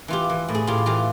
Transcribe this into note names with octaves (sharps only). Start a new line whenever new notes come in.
E3 F4 G4
E3
A2
G#4
A2 F4 G4
E3 F4 G4